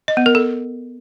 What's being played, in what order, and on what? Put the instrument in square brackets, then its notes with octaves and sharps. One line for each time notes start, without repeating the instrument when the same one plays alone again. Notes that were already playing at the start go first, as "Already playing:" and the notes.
[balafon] D#5
B3
A#4
A4